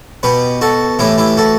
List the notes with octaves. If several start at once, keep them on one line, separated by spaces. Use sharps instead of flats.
B2 G4 B4
F#4 A4
A2 E3 E4 G4
E4 G4
F#4 A4